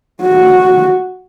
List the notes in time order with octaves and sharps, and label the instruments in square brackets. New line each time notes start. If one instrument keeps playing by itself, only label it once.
[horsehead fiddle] F#4